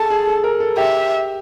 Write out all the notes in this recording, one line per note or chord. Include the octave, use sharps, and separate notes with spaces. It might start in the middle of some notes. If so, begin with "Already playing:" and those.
Already playing: G#4 A4 A5
G#4
A4
A#4
A4
G4 E5